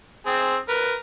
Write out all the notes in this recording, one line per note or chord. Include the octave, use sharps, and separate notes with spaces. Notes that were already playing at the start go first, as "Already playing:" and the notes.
C4 G#4
A#4 B4